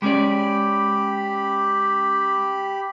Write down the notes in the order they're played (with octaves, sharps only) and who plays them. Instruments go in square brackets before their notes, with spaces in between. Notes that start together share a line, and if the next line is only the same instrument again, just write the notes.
[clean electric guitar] G#3 C#4 D5 [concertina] G4 B5